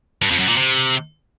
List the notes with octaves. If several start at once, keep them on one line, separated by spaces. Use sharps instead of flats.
G2
F2
F#2
A#2
C3